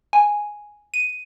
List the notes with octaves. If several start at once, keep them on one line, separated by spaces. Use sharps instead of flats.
G#5
D#7